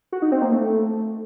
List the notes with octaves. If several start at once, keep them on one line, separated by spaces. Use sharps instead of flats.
F#4
D#4
C4
A#3
A3